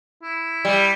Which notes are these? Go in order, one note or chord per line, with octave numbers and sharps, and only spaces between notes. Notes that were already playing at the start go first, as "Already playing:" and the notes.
E4
G3